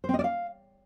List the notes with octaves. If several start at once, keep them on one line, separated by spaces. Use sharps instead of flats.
C5
C4
D#5
D5
F5